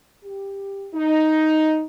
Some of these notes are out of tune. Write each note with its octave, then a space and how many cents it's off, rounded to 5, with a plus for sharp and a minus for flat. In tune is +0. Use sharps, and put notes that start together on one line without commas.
G4 +10
D#4 +5